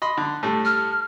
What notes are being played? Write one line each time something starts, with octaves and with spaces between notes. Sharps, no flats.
D#5 B5 C6
D3
A2 G3 A3
F6